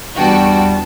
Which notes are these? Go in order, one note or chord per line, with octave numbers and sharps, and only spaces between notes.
E2 G3 D4 F#4 G5 A5